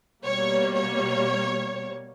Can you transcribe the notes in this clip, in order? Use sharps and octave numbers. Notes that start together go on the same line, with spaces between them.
B2 G3 A#3 C#5
C#5